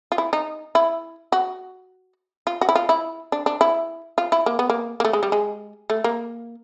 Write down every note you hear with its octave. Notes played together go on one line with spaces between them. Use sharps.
F4
E4
D#4
E4
F#4
F4
F#4
E4
F4
E4
D4
D4
E4
F4
E4
A#3
B3
A#3
A#3
A3
G#3
G3
G#3
A3
A#3